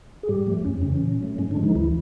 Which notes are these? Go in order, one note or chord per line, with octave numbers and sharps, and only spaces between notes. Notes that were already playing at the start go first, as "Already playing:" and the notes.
G#4
G#2 G3 G4
F3 A3
F2 C#4
C4
C#3 C#4
E3
A#2
F#3 A3
G#2 C#4
D3 D4
F3 G#3
D#3 D#4
D2 E3 E4